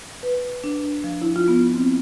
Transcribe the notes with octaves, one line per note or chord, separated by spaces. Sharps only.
B4
D4
F3
E4
F4
B3
C4